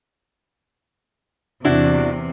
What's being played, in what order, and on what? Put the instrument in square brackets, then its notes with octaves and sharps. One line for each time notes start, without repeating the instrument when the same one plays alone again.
[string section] E2 C3 [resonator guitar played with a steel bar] D4 E4 F#4